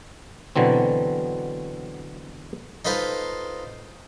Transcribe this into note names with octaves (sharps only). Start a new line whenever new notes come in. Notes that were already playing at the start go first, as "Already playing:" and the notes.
B2 D3 E3 F#3 C4
D#4 F4 A4 B4 C5 F5